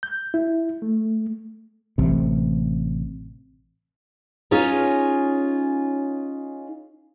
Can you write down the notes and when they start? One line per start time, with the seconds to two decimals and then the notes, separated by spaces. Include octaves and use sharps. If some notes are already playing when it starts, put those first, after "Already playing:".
0.03 G6
0.34 E4
0.82 A3
1.98 A1 C3
4.51 C#4 D#4 F4 G#4 C#5 D#5